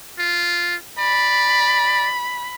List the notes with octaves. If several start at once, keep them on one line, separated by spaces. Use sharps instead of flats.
F4
D5 B5